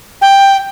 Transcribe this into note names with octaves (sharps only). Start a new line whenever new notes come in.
G5